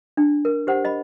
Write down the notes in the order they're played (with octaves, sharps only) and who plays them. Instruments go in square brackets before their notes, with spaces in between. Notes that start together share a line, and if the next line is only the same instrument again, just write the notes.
[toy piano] D4
A#4
G4 C5 F#5
D#5 B5